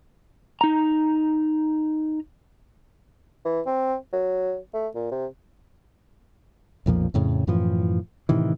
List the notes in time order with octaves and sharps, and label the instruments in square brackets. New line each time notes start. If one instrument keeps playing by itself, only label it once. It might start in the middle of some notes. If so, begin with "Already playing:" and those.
[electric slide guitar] D#4 A#5
[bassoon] E3
C4
F#3
A3
A#2
C3
[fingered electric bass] B1 F2 A#2 F3
F2 A2 C#3
F#2 A2 E3 F3
A2 C3 D#3 E3